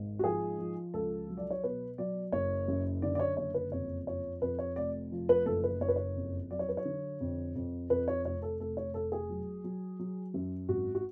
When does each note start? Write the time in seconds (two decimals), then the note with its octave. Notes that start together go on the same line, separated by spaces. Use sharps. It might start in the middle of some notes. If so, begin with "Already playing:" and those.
Already playing: G#1 G#2
0.19 F#4
0.24 F3 G#4
0.59 F3
0.94 C#2 A4
1.28 F#3
1.37 D5
1.50 C#5
1.63 B2 B4
1.98 F#3 D5
2.32 F#1 C#5
2.68 F#2
3.02 D3 D5
3.15 D5
3.19 C#5
3.37 F#1 C#5
3.54 B4
3.72 F2 C#5
4.07 F3 C#5
4.42 F2 B4
4.59 C#5
4.76 F1 D5
5.12 F3
5.29 B4
5.46 F#1 A4
5.64 B4
5.81 F#1 C#5
5.88 B4
5.96 C#5
6.16 F2
6.51 F#3 D5
6.59 C#5
6.69 B4
6.77 C#5
6.85 D3
7.21 F2
7.55 F2
7.90 F2 B4
8.08 C#5
8.25 F1 C#5
8.42 A4
8.60 F1 A4
8.77 C#5
8.94 F1 A4
9.12 G#4
9.29 F#3
9.64 F#3
9.99 F#3
10.34 F#2
10.68 G#1 F#4
10.95 F#4